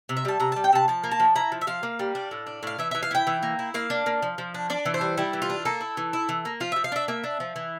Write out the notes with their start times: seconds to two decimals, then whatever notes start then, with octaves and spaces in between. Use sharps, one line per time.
0.09 C3
0.17 E5
0.25 G3 A5
0.40 C3 A#5
0.52 G3 A5
0.64 G5
0.73 C3 A5
0.88 F3 A5
1.04 A#3
1.12 A5
1.20 F3
1.36 E4 A#5
1.52 F3
1.61 E5
1.67 F3 F5
1.83 A#3
1.99 G3
2.15 D4
2.31 A2
2.47 D4
2.63 A2 F5
2.78 E3 E5
2.91 E3 E5
3.03 F5
3.11 E4 G5
3.27 E3
3.43 A#3
3.59 E4
3.74 A#3 F5
3.90 D4
4.06 A#3
4.22 F3
4.38 F3
4.54 D4
4.70 D4 D5
4.85 E3
4.94 C5
5.01 G3
5.17 G3 E4
5.33 E3
5.42 F4
5.50 D4
5.65 A#3 A4
5.81 E4
5.97 E3
6.13 E4
6.29 E3
6.45 A#3
6.60 F3 F4
6.72 F3 E5
6.84 F5
6.92 D4 E5
7.08 A#3 E5
7.24 D4
7.40 F3
7.56 E3